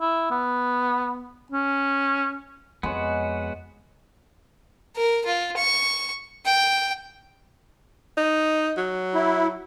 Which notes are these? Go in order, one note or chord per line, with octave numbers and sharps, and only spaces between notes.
E4
B3
C#4
F2 G#3 B3 F#4 C#5
A#4
F4
C#6
G5
D#4
F#3
E4